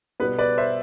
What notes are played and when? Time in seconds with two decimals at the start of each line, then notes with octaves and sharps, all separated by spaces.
0.20 B2 G3 B3 B4
0.39 B4 D5
0.58 C5 E5